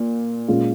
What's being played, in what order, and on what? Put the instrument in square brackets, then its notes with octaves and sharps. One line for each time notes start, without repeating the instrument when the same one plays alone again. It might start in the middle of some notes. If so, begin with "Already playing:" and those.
Already playing: [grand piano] A#2
A#2 G#3 C#4 F4